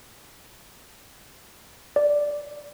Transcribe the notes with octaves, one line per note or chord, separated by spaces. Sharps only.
D5